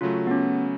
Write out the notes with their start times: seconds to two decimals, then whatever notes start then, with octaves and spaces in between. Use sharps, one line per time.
0.01 C#3 F#3 A3 F4
0.27 B3
0.31 C#4